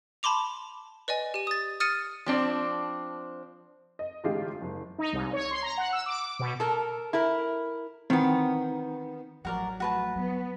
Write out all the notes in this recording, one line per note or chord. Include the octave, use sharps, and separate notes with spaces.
A5 B5 C6 D6 F7
B4 D5 D#5 G#5
G4 D#7
D#6 A6
D#6 F6 A6 C#7 D#7
F3 C4 D4
D#5
A1 D3 G#3 F4 G4 C7
F#1
D#4
C2
C#5
C6
A#5
F#5
E6
D6
B2
A4 A#4
E4 A#4
D#3 E3 B3 C4
A1 F3 F#3 A3 F#4 A#4 D5
F#4 B4 A5
F#3 B3